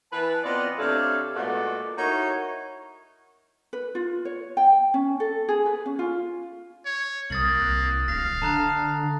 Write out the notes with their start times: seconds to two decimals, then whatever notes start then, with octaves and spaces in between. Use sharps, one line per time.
0.13 E3 B4 A5
0.44 B3 C4 F4 D5 D#5
0.79 C3 A3 D4 A4 C#5 F5
1.34 A#2 G#3 A3 B3 F#4 D5
1.97 D#4 E4 F#4 A#4 C#5
3.73 B4
3.95 F4
4.25 C#5
4.57 G5
4.94 C#4
5.20 A4
5.49 G#4
5.66 B4
5.86 C#4
5.99 F4
6.85 C#5
7.30 C2 A#3 D#6 A6 F#7
7.61 C2 F#6
8.08 D1 F5 A#6
8.42 D3 A5 A#5 F#6